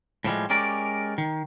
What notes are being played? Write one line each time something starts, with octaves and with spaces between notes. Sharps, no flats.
A2 F3 G3 G#3
G#3 C#4 G4 A#4 D5
D#3